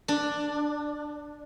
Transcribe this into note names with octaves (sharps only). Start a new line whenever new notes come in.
D4